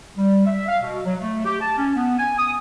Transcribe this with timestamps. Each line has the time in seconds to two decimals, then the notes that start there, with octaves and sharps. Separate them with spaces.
0.17 G3
0.46 E5
0.68 F5
0.82 B2
1.05 F#3
1.20 A3
1.45 G4
1.60 A5
1.77 C#4
1.95 B3
2.18 G#5
2.38 D#6